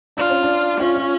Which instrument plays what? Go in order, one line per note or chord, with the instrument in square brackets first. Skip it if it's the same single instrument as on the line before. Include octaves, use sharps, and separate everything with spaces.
[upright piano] D4 [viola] F4
[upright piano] C#4
D4
[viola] C#4 [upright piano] F4
[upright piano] F4